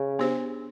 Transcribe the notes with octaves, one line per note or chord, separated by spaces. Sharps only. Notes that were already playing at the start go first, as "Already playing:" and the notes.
Already playing: C#3
B3 D4 G4 C5